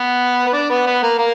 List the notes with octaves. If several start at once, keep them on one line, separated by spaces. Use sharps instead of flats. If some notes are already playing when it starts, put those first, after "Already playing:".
Already playing: B3 B4
B4
D4 D5
B3 B4
B3 B4
A#3 A#4
A#3 A#4